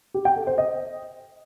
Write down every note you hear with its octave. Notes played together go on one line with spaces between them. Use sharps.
G4
G5
A4
C5
D#5